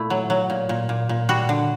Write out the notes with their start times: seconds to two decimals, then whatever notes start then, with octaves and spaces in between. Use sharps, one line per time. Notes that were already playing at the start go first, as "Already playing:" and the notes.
Already playing: A#2 A3 E4
0.10 F#3
0.30 F#3
0.50 A#2
0.69 A#2
0.89 A#2
1.09 A#2
1.29 G3 F#4
1.49 D3